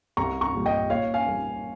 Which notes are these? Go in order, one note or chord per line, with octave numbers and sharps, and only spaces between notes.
C2 A#5 C#6
A#5 C#6
A#2 G3
D#5 G5
A#2 C#5 F5
F5 G#5
G3 A#3